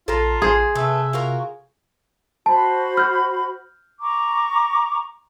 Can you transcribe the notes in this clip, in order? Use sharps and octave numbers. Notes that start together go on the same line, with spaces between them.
A#1 F4 A4 A#5
A1 G#4 C5
C3 A3 B4 E5
F4 F#4 A#4
F#4 C5 A5 B5
F6 G6
A#5 C#6 D6